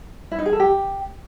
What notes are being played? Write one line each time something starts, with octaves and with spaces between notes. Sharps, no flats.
E4
D#4
G#4
A4
G4